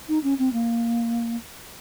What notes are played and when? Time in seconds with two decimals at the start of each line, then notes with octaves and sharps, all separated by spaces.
0.08 D#4
0.24 C#4
0.39 C4
0.53 A#3